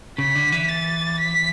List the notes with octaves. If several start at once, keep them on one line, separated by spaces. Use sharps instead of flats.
C#3 B6
D3
E3
A6
B6